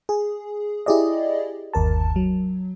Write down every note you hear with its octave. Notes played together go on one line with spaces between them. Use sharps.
G#4
E4 G4 G#4 D5 D#5
G1 D#2 A#4 A5
F#3